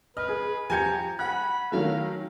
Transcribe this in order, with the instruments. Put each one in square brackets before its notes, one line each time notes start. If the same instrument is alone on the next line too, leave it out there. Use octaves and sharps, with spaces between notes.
[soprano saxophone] B4 [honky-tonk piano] D#5 [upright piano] F6
[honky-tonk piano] G#4
[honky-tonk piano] F3 G4 C#7 [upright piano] G#5 G6 G#6 [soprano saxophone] A#5
[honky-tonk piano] F#5 F#6 [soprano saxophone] B5
[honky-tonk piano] D#3 F#3 A3 [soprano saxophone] F5